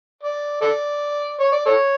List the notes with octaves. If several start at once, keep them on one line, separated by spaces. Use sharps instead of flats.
D5
A4 D5
C#5
D5
A4 C#5